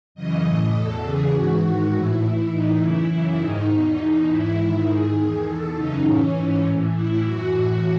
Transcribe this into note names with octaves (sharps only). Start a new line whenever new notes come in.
F#2 C#3 E3 D#5
A2 E3
E2 B2 A4
E2 C#3 E3 G#4
G#2 E3 F#4
G#2 D#3
A2 E3 E4
A2 E3
A2 E3 D#4
F#2 C#3 E3 E4
F#2 C#3 E3
G#2 D#3 D#4
E2 B2 D#4
E2 B2
G#2 E3 E4
G#2 D#3
G#2 D#3 G#4
E2 D#3
E2 B2 A4
F#2 C#3 E3 D#4
A2 E3 C#4
G#2 E3
A2 E3
A2 E3 E4
F#2 E3 F#4
A2 E3